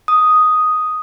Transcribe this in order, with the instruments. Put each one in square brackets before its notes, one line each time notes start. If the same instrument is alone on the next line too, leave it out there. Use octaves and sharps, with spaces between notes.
[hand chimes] D#6